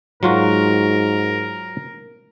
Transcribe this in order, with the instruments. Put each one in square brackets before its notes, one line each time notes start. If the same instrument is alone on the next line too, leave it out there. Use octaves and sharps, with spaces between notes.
[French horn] G#2 [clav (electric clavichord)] F#3 F4 F#4 [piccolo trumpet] A#4